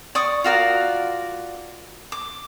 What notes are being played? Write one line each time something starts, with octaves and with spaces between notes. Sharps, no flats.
D5 C#6 D#6
F4 F#4 A#4 D5
D6